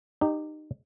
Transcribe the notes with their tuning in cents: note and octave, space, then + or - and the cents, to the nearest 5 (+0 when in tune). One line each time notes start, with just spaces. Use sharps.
D#4 -25 G4 +0